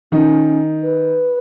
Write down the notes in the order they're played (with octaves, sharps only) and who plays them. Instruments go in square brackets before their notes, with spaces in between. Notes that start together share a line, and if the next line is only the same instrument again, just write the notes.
[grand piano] D#3 D#4 [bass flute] C#4
[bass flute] B4